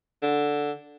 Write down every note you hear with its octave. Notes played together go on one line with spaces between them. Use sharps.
D3